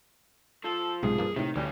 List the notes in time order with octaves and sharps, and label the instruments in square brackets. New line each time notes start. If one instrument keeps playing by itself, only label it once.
[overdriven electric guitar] F3 [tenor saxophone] A4
[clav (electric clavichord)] B1 G#2 C3 [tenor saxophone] G#4
[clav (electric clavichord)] G2 A#3
[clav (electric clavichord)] A2 C3 [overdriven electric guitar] D#3
[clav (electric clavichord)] D2 [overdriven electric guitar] E3 C#4 [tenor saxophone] G3